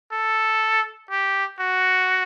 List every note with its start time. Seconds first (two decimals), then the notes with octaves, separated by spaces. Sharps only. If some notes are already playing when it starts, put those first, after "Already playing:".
0.13 A4
1.11 G4
1.60 F#4